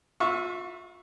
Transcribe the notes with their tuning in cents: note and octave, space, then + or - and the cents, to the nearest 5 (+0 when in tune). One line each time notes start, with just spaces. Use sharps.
F4 +40 E5 +0 C#6 +0